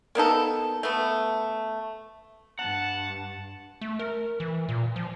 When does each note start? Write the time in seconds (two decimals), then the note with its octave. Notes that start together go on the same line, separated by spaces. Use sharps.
0.15 A#3 B3 D#4 A4
0.83 A3 B3
2.59 G2 F#5 A5
3.81 A3
3.99 A#4
4.40 E3
4.69 A#2
4.96 F3